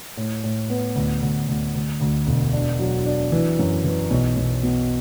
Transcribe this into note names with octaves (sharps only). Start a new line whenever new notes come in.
A2
A2
B3
D2
D2
D2
D2
D2
E1
D4
F#3
D4
E3
F#2
E3
B1
B1
B2